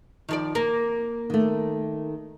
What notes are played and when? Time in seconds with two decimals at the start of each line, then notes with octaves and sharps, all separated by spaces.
0.29 D#3 F3 D5
0.55 A#3
1.30 D#3 A3